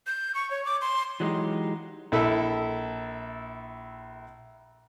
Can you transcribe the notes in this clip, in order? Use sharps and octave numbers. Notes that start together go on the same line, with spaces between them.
G6
C#6
C#5
D6
C6
E3 F#3 G#3 D4 D#4 G4
A#1 E4 A4 E5